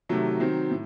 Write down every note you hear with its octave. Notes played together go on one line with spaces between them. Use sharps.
C3 D#3 F#3 A3
D#3 F#3 C4
A2